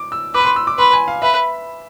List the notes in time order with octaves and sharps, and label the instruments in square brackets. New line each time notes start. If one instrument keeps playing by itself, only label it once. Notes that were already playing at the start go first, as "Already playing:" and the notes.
Already playing: [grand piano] D6
E6
[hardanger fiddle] B4 [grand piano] D6
[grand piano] B5
C6
E6
D6
[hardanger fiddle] B4 [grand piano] C6
[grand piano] G#5
F5
[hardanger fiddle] B4 [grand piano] E5